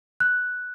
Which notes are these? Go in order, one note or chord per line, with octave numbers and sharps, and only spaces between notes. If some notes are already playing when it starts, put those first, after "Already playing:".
F#6